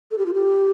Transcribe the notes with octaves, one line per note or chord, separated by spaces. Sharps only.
A4
G4
F4
G4